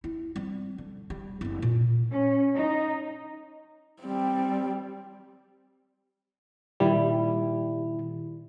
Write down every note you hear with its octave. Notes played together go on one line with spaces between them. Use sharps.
E4
G3 C4
D3
G3
F#1 C4
A#2
C#4
D#4
G3 C4
A#2 D#3 G3 E4